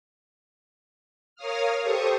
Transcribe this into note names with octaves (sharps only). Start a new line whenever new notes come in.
A#4 C#5 F5 D#6 F6
G4 A4 C5 C#6 D#6